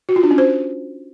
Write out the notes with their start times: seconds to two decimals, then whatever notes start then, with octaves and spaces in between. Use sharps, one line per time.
0.09 F#4
0.16 F4
0.23 D4
0.31 C#4
0.38 C5